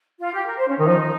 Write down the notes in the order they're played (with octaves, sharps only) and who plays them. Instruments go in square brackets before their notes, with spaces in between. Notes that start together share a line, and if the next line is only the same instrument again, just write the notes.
[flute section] F4
G4
A#4
C5
C#4
[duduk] D#3 [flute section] D#4
[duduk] F3